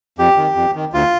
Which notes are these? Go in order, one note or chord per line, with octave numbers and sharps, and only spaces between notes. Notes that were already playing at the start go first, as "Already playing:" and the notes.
F2 G4
D#3
F2
D#3
D2 F4